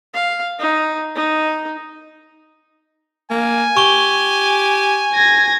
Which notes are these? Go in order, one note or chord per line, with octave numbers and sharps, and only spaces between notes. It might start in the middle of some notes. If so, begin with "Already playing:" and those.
F5
D#4
D#4
A#3 G#5
G4 C#6 G7
G#6 A#6